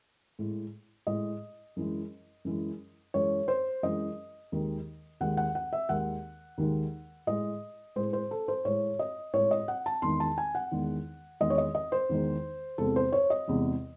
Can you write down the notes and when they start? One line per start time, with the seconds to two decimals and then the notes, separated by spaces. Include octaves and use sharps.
0.39 A2 G#3
1.07 A2 G#3 D#5
1.76 F#2 E3 G#3
2.45 F#2 E3 G#3
3.14 F#2 E3 G#3 C#5
3.48 C5
3.83 F#2 E3 G#3 D#5
4.52 D#2 D#3 G#3
5.21 D#2 D#3 G#3 F#5
5.37 F#5
5.55 F#5
5.73 E5
5.89 D#2 D#3 G#3 F#5
6.58 D#2 D#3 G#3
7.27 A2 G#3 D#5
7.96 A2 G#3 C5
8.13 C5
8.31 A4
8.48 C5
8.65 A2 G#3 C#5
8.99 D#5
9.33 A2 G#3 C#5
9.51 D#5
9.68 F#5
9.86 A5
10.02 E2 D#3 G#3 C6
10.20 A5
10.38 G#5
10.55 F#5
10.72 E2 D#3 G#3
11.40 E2 D#3 G#3 D#5
11.50 C#5
11.58 D#5
11.75 D#5
11.92 C5
12.09 E2 D#3 G#3
12.78 E2 C3 E3 G#3 A4
12.96 C5
13.13 C#5
13.30 D#5
13.48 E2 C3 E3 G#3